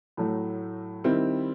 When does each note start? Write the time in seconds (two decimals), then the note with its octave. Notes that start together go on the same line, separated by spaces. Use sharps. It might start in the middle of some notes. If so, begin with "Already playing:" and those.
0.17 A2 F#3 A3
1.04 D#3 G3 C4 E4